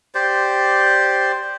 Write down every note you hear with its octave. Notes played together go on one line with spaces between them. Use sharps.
G4 C5 D5